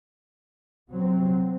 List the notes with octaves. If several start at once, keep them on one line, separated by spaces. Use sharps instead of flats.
C3 F#3 C4